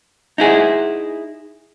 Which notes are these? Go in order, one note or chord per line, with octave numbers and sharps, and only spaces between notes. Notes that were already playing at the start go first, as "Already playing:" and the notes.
D#4 E4 G#4